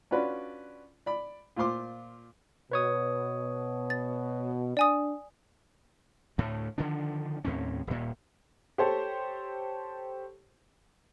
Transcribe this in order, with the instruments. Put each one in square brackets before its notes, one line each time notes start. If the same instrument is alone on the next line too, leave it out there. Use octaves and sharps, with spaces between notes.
[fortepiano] C#4 D4 F4 F#4 B4 D5
D5 B5
A#2 F4 C5 C6 D6
[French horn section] B2 [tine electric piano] B4 C#5 D#6
[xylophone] A6
[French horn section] D4 [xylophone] D5 G#5 D#6
[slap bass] D2 A2 A3
D3 D#3 F3 D4
D#2 A2 C4 C#4
D#1 A#2
[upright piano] G4 A4 C5 C#5